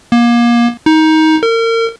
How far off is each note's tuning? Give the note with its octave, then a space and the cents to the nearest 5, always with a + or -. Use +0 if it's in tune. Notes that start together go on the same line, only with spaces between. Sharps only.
A#3 +30
D#4 +20
A#4 -35